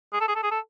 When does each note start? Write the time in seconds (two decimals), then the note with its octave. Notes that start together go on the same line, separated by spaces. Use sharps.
0.13 G#4
0.20 A4
0.28 G#4
0.36 A4
0.43 G#4
0.51 A4